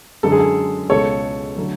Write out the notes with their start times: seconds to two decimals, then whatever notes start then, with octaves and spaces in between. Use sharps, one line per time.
0.23 F#2 D3 G#3 A4
0.32 G#4
0.39 A4
0.89 C#2 B2 G#3 A4 C#5
1.57 D3 F#3 A3